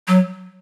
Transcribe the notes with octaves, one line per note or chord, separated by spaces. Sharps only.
F#3